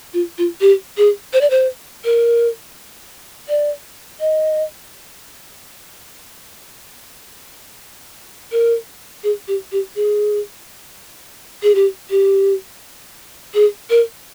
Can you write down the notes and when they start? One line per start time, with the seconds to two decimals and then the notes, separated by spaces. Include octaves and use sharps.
0.14 F4
0.38 F4
0.61 G4
0.98 G#4
1.33 C5
1.41 D5
1.50 C5
2.05 A#4
3.49 D5
4.20 D#5
8.52 A#4
9.24 G#4
9.48 G4
9.72 G4
9.96 G#4
11.63 G#4
11.75 G4
12.10 G4
13.54 G#4
13.90 A#4